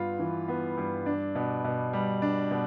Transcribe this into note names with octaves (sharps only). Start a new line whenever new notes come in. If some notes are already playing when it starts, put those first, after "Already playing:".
Already playing: G2 B3 F4
E3
B3
G2
D4
B2
B2
G3
D4
B2